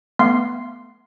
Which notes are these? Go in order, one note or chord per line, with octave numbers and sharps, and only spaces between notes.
A3 B3 F5 C6 C7